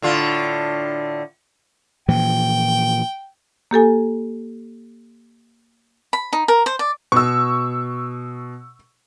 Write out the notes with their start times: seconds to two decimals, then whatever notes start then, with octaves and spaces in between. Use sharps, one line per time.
0.02 A2 D3 F4
2.08 A#2 E3 F3 G5
3.71 A#3 G4 A4 G#5
6.13 B5
6.33 D#4
6.48 A#4
6.66 C5
6.79 D5
7.12 B2 C#6 E6